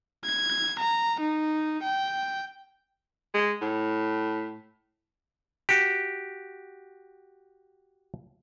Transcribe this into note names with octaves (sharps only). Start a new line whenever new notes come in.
G#6
A#5
D#4
G5
G#3
A2
F#4 G4